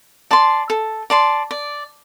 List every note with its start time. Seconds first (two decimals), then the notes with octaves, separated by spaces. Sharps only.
0.31 D5 A5 C6
0.70 A4
1.10 D5 A5 C6
1.51 D5